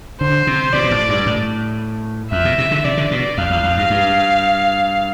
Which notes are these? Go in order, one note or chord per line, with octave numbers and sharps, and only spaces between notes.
D3 C5
C3
B2 D5
B2
A2
G2
A2
F2 E5
B2
C3
D3
C3 D5
D3
B2
F2 F5
E2
F2
G2
G2